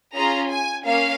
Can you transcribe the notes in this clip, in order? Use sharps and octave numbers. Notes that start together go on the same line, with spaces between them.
C#4 F4 G#4 A#5
G#5
A#3 C#4 F5